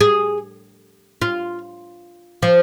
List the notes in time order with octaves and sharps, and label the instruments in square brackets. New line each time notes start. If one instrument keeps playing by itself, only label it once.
[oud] G#4
F4
F3